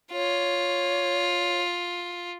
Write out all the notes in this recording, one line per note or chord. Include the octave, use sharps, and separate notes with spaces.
F4 C#5